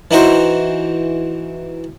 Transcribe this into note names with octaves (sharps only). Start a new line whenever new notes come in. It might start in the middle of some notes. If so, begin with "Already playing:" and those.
E3 D#4 F#4 C5